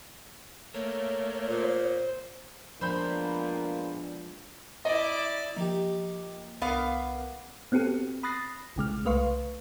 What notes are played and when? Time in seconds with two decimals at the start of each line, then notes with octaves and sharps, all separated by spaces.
0.74 A3 A#3 C#5
1.48 A#2 C5
2.81 A#2 F3 G#3 B3 D4 C5 B5 G6
4.85 E4 D5 D#5
5.56 F3 A#3 D#4 G4
6.62 C2 B3 A#4 F5 D6
7.72 B3 C4 F#4 G4 A4
8.23 B5 D#6 F#6 A6 A#6 C7
8.76 A#1 C#3 G#3 F6
9.05 C2 A3 B4 F5 C6 C#6